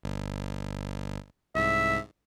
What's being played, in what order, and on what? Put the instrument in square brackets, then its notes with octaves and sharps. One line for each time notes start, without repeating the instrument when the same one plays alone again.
[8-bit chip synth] G1
[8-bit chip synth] C2 G#2 [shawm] E5